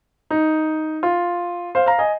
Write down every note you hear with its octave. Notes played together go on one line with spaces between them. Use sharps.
D#4
F4
C5 F5
F5 A#5
D#5 G#5